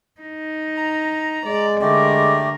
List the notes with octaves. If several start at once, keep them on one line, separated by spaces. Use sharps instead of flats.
D#4
A#5
G#3 D5
D3 A3 G4 A#4 D5